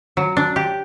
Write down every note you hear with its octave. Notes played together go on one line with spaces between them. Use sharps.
F#3
D4
G4